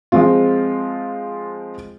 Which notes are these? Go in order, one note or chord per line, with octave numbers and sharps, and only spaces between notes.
F3 G#3 C4 F4